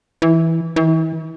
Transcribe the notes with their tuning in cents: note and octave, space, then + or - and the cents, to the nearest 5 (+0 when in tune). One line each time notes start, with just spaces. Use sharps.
E3 -10
E3 -40